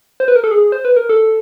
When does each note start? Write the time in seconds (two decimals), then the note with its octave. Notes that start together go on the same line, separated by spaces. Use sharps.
0.20 C5
0.28 B4
0.36 A#4
0.44 A4
0.51 G#4
0.72 C5
0.85 B4
0.96 A#4
1.09 A4